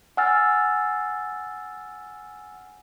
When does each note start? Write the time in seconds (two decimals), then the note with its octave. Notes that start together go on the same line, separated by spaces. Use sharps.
0.17 F#5 G#5 E6 F6 A6